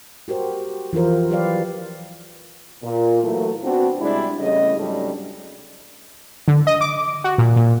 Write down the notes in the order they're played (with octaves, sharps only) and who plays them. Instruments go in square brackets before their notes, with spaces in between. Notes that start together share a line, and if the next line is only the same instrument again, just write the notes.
[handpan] F#4 G4 A#4 C5
E3 F3 F4 A#4 C5
F#3 G4 B4 C5 D5 F5
[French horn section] A#2
A#2 E3 F#3 A3
B3 C4 D4 F#4
C3 G3 G#3 D4 E4 D5
E2 C#3 G3 A3 D#5
G#2 C#3 F#3 G3 A3 D4
[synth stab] D3
D#5
D6
F#4
A#2
A#2